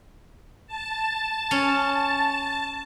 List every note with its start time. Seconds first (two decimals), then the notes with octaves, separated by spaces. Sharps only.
0.67 A5
1.51 C#4